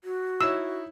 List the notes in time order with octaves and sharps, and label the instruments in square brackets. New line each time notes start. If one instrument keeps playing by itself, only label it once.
[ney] F#4
[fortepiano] D#4 E4 C#5 [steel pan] E6